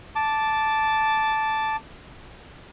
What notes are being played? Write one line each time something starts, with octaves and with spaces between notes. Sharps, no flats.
A5 D6